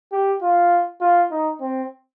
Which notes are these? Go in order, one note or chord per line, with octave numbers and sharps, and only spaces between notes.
G4
F4
F4
D#4
C4